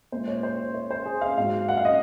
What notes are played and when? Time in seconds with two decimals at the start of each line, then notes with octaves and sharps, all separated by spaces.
0.12 A#2 G#3 C5
0.28 C#5
0.43 C5
0.58 C#5
0.75 C#5
0.91 C5
1.06 G#4
1.21 F5
1.37 G#2 F#3 F5
1.69 F#5
1.77 F5
1.85 D#5